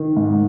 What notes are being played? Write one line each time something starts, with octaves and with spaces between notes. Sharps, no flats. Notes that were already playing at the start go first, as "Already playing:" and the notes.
Already playing: D#3
G#2